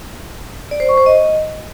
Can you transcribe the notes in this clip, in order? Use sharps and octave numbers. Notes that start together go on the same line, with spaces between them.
D5
C5
C#6
C5
D#5